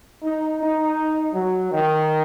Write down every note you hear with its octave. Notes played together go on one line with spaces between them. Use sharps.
D#4
D#4
F#3
D#3